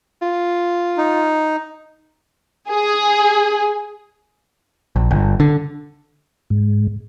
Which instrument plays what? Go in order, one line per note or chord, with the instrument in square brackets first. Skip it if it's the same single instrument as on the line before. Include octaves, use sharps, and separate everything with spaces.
[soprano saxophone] F4
[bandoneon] D#4
[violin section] G#4
[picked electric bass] A#1
G1
D3
[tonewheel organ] G#2